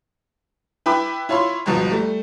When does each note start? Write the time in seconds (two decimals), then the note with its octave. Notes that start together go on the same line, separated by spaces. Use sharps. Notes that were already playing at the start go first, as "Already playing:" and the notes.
0.86 E4 B4 G5 B5 D6
1.29 E4 F4 C#5 B5 C6
1.66 G1 C#2 B2 F3
1.91 G3 A3